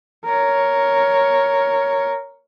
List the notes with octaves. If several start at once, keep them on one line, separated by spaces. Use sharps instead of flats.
A#4 C#5